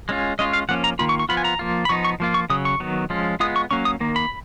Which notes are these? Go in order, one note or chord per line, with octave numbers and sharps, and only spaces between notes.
G#3 C#4 F4
G#3 C#4 F4 D#5
F5
F3 A#3 C#4 F#5
A#5
D#3 A#3 F4 B5
C#6
C#6
F3 B3 F4 B5
G#5
A#5
F3 A#3 F4
B5
F3 B3 D#4 C#6
C#6
F3 A#3 F4
C#6
C#3 F#3 D#6
C#6
D#3 F#3 B3
F3 G#3 C#4 F4
G#3 B3 F4 D#6
C#6
F#3 A#3 C#4 C#6
D#6
D#3 A#3
B5